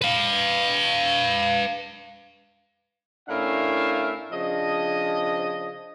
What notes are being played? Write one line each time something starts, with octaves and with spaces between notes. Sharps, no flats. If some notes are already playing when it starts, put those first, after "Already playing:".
B4 F5
A2 C#4 D4 A#4 E5 F5
C#3 F3 D4 D#5